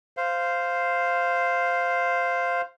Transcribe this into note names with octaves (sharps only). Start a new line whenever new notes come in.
C5 F5